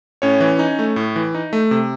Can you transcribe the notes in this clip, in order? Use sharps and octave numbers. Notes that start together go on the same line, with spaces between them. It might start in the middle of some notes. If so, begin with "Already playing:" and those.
A2 C#4 C#5
E3
D#4
A3
A2
E3
D#4
A3
C3